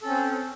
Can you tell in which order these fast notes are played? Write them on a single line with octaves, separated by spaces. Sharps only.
A4 C#4 C4